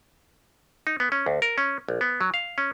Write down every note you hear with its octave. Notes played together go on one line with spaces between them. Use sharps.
D#4
B3
C#4
D2
A#4
C#4
A#1
B3
F#3
F5
C#4